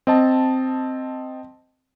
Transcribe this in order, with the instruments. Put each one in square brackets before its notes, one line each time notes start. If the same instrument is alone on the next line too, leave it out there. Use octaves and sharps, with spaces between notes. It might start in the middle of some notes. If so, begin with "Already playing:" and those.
[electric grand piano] C4 D#5 A5